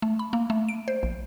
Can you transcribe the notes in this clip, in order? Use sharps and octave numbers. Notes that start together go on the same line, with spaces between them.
A3
B5
A#3
A3
D7
C5
A#1